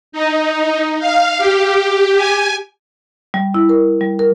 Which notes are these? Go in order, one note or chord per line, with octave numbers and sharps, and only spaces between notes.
D#4
F5
G4
G#5
G3
E4
A#4
G3
A#4